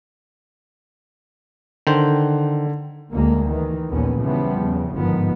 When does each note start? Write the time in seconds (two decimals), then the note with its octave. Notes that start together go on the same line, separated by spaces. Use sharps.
1.87 D3 D#3 C5
3.11 D2 G#3 A#3
3.47 D#3 E3
3.88 A#1 D#2 D3 B3 C#4
4.21 C#3 E3 F3 G3 B3
4.57 E2 C#3
4.95 G1 G#2 D#3 F3 B3